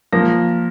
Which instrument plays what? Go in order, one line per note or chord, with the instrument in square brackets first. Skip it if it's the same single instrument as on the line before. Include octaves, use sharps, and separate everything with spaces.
[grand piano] F3 A#3 A#6